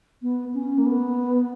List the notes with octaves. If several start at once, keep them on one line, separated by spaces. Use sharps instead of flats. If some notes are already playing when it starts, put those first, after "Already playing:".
B3
C#4
A#3
B3